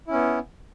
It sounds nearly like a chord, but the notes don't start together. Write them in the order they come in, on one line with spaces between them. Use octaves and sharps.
E4 C#4 B3